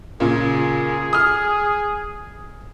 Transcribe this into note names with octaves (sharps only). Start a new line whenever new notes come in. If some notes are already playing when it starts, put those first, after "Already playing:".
A#2 C#3 G#4
D#6 F6